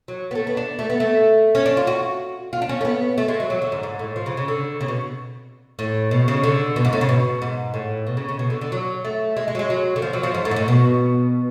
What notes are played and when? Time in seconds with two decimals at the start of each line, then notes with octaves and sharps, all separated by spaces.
0.08 F#3
0.31 B3
0.35 A3
0.47 B3
0.57 D4
0.79 A3
0.90 B3
1.00 A3
1.55 C#4
1.66 D4
1.77 F4
1.87 F#4
2.53 F4
2.62 D4
2.69 C#4
2.81 A3
2.85 B3
3.18 A3
3.28 G#3
3.40 F#3
3.50 F#3
3.62 D3
3.72 G#2
3.83 G#2
3.99 A2
4.16 F3
4.26 C#3
4.37 C#3
4.48 D3
4.81 C#3
4.88 B2
5.79 A2
6.11 B2
6.28 C#3
6.43 D3
6.76 B2
6.85 G#2
6.93 A2
7.01 C#3
7.09 B2
7.42 G#2
7.74 A2
8.07 B2
8.17 C#3
8.29 C#3
8.39 B2
8.50 D3
8.61 D3
8.72 F#3
9.05 A3
9.37 G#3
9.48 G#3
9.55 F#3
9.59 G#3
9.70 F#3
9.96 D3
10.02 F3
10.13 F#3
10.23 F3
10.35 G#2
10.45 A2
10.51 G#2
10.56 A2
10.68 B2